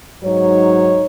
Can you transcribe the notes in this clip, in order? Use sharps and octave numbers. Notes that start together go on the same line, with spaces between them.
G#2 F#3 D#4 C#5